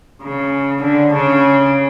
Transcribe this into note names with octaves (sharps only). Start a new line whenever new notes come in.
C#3
D3
C#3